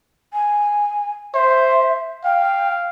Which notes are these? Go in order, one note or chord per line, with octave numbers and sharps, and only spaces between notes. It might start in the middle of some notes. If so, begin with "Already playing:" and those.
G#5
C5 E5
F5 G5